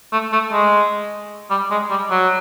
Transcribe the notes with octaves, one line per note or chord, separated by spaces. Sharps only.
A3
A3
G#3
G3
G#3
G3
F#3